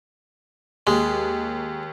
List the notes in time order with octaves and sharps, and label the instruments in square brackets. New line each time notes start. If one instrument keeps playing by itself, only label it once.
[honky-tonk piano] D#2 [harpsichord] G#3